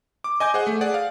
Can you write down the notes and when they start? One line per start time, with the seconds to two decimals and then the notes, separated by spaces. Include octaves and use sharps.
0.24 D6
0.40 D#5 G#5 D6 G6
0.54 G#4 C5 F#5
0.67 A3
0.81 G#4 D5 F#5
0.94 F5